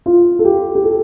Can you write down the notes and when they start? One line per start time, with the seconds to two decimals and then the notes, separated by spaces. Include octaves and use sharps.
0.06 F4
0.39 A4
0.45 G4
0.75 G4
0.84 A4